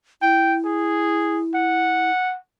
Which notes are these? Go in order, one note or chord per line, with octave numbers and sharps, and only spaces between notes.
E4 G5
G#4
F#5